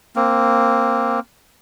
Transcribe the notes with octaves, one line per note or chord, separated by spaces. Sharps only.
A#3 C4